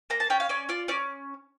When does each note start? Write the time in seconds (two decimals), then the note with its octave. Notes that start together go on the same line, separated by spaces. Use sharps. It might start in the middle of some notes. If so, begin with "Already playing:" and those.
0.10 A#3 A#5
0.20 A5
0.30 C#4 G5
0.40 F5
0.49 C#4 D5
0.69 F4 D5
0.88 C#4 D5